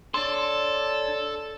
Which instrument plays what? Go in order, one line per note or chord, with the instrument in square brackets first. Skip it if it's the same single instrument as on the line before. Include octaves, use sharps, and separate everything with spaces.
[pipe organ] D4 C#5 [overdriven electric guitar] A4 [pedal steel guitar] D5 C6